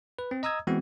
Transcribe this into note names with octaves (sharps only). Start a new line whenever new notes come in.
B4
C4
D#5 A#5 D#6 E6 G#6
E3 G#3 B3 C4 F#4